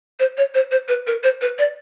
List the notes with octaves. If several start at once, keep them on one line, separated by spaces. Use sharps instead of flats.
C5
C#5
C5
C5
B4
A#4
C5
B4
D5